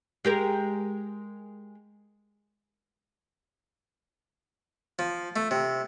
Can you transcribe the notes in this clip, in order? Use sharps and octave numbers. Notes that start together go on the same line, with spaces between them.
G#3 G4 A#4
F3
A3
C3